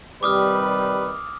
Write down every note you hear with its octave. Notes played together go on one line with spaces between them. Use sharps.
C3 D#3 G3 B4 D6 D#6 F6